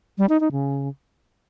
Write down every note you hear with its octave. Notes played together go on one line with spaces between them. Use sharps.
G3
D#4
D#4
C#3